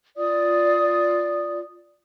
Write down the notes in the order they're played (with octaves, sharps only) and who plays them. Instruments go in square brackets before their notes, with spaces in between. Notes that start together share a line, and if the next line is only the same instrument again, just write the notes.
[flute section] F4 D5 D#6